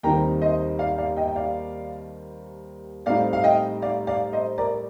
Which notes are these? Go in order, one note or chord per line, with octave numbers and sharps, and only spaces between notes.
D#2 D#3 G3 C4 D#4 G5 A#5
C5 D#5
D5 F5
D5 F5
D#5 G5
G5
D5 F5
A2 G3 C4 D#4 D5 F5
F5
D#5 G5
D5 F5
D5 F5
C5 D#5
A#4 D5